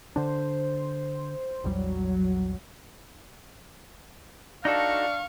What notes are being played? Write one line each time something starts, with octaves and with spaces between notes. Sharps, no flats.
D3 D4 C5
A#1 E2 F#3 G3
D4 D#4 F#4 A4 F5 C#6